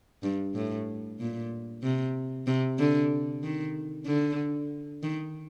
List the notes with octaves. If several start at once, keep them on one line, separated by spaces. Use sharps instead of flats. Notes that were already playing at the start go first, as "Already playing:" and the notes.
G2
A2
A#2
C3
C3
D3
D#3
D3
D#3